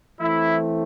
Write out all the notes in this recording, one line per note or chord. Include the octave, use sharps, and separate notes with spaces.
E3 A3 C4 E4